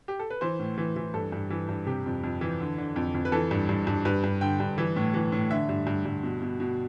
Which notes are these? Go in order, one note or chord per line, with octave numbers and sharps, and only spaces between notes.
G4
A4
B4
E3 C5
A2
E3
E3
G2 A4
G2
E3
G2
C3 G4
F2
F2
E3
D3
D3
F2
F2
B4
E3 A4
G2
G2
G2
G2 B4
G2
D3 G5
G2
E3
A2
E3
A2
D3 E5
G2
G2
G2
B2
B2
B2